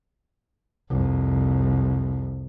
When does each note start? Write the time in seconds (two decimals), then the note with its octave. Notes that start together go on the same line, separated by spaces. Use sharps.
0.90 C2 F2